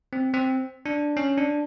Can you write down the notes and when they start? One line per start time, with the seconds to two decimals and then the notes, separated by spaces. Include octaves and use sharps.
0.13 C4
0.34 C4
0.86 D4
1.17 C#4
1.38 D4